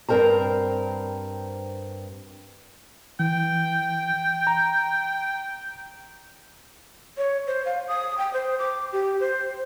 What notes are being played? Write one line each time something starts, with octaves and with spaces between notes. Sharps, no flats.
G2 C4 A#4 C5 A#5
E3 G5
A#5
C#5
C5
F5
D#6
G5
C5
D6
G4
C5